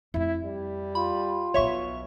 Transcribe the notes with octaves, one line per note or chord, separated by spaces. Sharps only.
F2 A3 E4
G3
F4 B5
B1 B2 C#5 E5 C#6